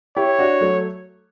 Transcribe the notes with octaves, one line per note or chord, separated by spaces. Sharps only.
E4 G4 C#5
D4 F#4
F#3 A3